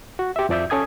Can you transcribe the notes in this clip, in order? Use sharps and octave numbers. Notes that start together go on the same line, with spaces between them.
F#4
G4 E5
F2 F3 D5 E5 G6
C#4 A4 G#5 D#6 G#6